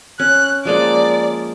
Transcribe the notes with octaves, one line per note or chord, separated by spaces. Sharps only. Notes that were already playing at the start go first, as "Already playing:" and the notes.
C#4 F#6
F3 G#3 A#3 D5